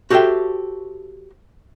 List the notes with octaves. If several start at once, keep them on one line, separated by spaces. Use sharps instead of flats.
F#4 G4 A4 C5 E5 G5